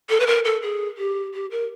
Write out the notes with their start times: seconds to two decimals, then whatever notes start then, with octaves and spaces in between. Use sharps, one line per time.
0.10 A4
0.20 B4
0.27 A#4
0.45 A4
0.63 G#4
0.98 G4
1.34 G4
1.51 A#4